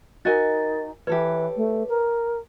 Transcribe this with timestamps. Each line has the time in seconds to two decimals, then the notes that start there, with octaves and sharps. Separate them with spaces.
0.25 D#4 F#4 A#4 D#5 G#5 A6
1.07 E3 G4 A4 B4 C#5
1.56 A3
1.88 A#4